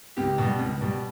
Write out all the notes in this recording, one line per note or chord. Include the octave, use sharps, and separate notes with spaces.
C#2 G4
B2 G3
C#2
B2 G3